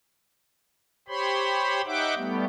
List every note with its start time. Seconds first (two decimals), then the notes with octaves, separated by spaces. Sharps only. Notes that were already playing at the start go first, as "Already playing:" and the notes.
1.08 G4 C5 C#5 B5 C6
1.86 D#4 E5 F#5 G5 D6
2.16 G3 A3 B3 G4